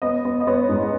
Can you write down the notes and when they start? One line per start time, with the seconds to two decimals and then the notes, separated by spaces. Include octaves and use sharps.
0.02 B3 D#5
0.25 B3
0.40 D#5
0.47 B3 C#5
0.69 G#2